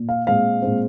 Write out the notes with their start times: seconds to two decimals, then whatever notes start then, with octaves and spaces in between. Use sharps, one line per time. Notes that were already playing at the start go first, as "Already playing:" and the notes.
Already playing: A#2
0.09 F5
0.27 A#2 G#3 C4 F5
0.62 A#2 G#3 C4